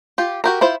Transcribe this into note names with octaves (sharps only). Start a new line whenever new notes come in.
F4 G4
F#4 G4 A#4
E4 F4 C5